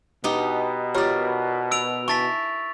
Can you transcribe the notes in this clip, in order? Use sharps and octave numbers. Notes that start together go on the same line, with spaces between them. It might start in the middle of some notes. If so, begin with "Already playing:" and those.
B2 B3 D#4 G4
F4 G4 A#4 C#5 D5
E6 D7 F7
E4 G#5 A5 C#6 A6 B6